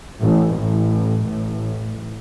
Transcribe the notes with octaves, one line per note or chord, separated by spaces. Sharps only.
A1 A2
A1 A2
A1 A2